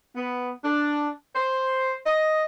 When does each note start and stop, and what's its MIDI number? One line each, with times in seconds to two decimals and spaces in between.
0.16 0.51 59
0.65 1.09 62
1.35 1.95 72
2.06 2.45 75